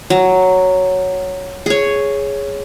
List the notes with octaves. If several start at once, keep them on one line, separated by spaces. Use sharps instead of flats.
F#3
G#4 C#5